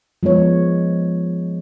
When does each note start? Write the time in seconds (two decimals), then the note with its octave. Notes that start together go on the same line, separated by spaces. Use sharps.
0.23 F3 G#3 B3 C#5